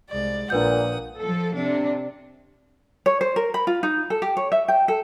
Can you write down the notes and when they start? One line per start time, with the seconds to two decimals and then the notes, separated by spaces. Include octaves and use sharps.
0.10 C2 G#3 D5
0.50 A#1 A#2 D4 B4 F#5 D#6 G6
1.19 F3 A4
1.55 C3 D4
3.06 C#5
3.21 C5
3.36 A#4
3.54 B5
3.67 F4
3.83 D#4
4.10 A4
4.22 G4
4.37 C#5
4.52 E5
4.68 G5
4.88 A4